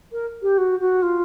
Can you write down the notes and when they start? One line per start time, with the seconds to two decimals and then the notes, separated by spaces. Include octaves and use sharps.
0.13 A#4
0.42 G4
0.58 F#4
0.80 F#4
1.02 F4